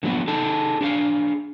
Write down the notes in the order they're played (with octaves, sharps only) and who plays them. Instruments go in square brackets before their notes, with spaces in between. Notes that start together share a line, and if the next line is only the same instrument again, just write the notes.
[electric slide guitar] D3 F3 F#3 A#3 B3
D#4 G#4 A4 A5
D4 G#4 F5